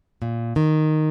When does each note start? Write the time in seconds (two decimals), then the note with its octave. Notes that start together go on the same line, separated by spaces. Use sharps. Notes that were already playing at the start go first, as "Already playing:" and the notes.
0.22 A#2
0.56 D#3